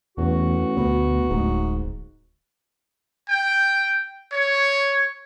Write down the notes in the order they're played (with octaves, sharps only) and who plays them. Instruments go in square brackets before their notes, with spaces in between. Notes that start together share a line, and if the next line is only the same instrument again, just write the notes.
[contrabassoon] A1 [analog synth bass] E2 [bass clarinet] F#4
[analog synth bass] D2 [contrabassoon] B2
[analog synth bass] D1 [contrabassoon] G#2
[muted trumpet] G5
C#5